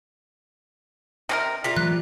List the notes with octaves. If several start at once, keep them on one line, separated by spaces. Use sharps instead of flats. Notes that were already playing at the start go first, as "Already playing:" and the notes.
C3 C#4 D#4 A#4
C3 G3 F4 A#4 B6
E3 F#3 A3 F#6